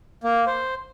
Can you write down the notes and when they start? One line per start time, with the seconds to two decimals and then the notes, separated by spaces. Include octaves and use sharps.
0.24 A#3
0.46 C5